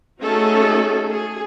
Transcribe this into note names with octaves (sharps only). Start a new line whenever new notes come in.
A3 C#4 D#4 F#4 G#4 A4
G#4